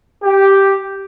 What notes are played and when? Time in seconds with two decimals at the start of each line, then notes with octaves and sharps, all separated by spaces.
0.24 G4